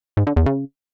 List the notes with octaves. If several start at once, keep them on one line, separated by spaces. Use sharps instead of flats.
G#2
D3
E2
C#3